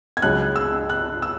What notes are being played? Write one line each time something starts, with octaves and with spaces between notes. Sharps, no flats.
G#6
C#2 C#3 F#3 F#6
E6
F#6
E6